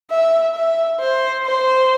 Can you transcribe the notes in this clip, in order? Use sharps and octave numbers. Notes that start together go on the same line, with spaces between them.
E5
E5
C5
C5